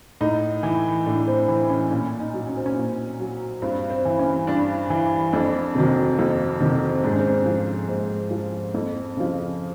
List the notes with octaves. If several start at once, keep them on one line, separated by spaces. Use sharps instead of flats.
A2 D#4
E3
A2 D4
C4
E3
C#4
A#2 C#4
D#4
F#3
C#4
C4
C#4
A#2
F#3
G2 C4
C4
E3
C#4
G2 D4
E3
F2 D4
C3 D#3 F#3
F2
C3 D#3 F#3
G#2 D4
C#4
C4
C#4
F3
G#2 C4
F3
F2
C#3 F3